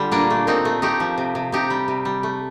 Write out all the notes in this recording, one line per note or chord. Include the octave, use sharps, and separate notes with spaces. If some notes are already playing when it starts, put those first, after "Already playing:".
Already playing: D3 G3 F4
A#2 A#3 D4
A3
A#2 C4 D#4
A3
A3 D#4 G4
F3
C3
C3
C3 D#4 G4
G3
C3
G3
A3